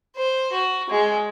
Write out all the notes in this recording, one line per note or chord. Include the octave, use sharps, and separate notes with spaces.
C5
F#4
G#3